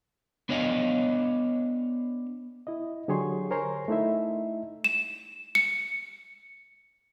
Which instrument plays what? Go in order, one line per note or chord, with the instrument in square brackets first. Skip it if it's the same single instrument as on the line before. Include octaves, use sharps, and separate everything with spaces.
[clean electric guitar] B3 D4 C#5 D#5 F5
[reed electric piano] E4 D#5
D3 F#3 G4 G#4 C#5 C6
A#4 C5 C#5 G#5 A#5 C6
A3 D#4 E4 E5
[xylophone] E7
C#7